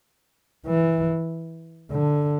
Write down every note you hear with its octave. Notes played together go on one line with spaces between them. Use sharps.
E3
D3